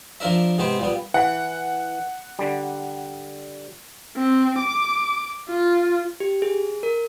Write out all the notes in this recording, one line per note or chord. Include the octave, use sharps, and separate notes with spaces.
F3 A#3 D4 A#4 E5
G#2 C3 B3 G4 C5 G5
A#2 G3 B3
E3 F#5
D3 G3
C4
D6
F4
G4
G#4
A#4